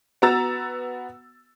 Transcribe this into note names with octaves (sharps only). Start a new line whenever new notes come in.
B3 F#4 A#5 E6 A6